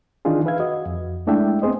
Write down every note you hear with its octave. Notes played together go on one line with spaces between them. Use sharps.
D#3 E3 D4 D#4 F4 G#4
B4 E5 F5 G#6
F#4 D#5
F2
G#3 A3 D4 E4 E5 G5
B3 C4 G#4 C5 D#5